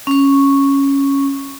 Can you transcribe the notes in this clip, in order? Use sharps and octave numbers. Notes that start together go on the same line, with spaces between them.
C#4 C#6